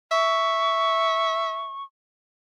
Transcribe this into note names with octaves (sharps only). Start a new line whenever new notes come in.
E5 C#6